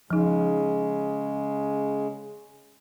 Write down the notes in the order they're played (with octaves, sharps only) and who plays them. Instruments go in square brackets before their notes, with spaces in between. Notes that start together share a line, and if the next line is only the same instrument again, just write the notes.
[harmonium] C#3 G#3 [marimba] F3 D#4